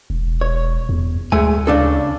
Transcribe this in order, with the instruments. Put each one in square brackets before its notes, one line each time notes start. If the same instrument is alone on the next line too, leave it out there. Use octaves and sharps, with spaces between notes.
[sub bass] E1
[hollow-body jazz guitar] C#5
[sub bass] E2
[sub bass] D2 [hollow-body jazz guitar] G#3 A3 G#5
[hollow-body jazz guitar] C#3 D4 A4